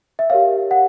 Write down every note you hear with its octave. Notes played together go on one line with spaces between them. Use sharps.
E5
G4 A#4 C#5 F5
F#5